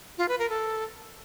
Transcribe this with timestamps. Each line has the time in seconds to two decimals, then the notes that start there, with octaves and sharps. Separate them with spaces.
0.18 F4
0.29 B4
0.39 A#4
0.50 A4